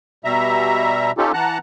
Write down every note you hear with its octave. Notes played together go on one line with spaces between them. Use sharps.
B2 G3 E5 A#5
C#4 D#4 F4 G4 A4
E3 F#5 A5 A#5 F#6